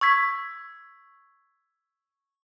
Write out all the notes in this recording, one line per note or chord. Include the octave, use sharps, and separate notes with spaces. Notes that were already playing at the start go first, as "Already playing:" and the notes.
C#6 E6 G#6 B6